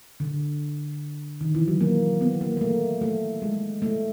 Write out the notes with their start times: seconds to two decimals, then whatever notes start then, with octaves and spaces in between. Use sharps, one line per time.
0.20 D3
1.41 D#3
1.55 E3
1.68 F#3
1.81 A#3
2.21 B3
2.41 A#3
2.57 A#3
2.61 A3
3.02 A3
3.42 G#3
3.82 A3